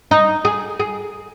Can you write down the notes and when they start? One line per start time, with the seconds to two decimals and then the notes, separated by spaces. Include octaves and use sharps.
0.11 D#4
0.45 G#4
0.80 G#4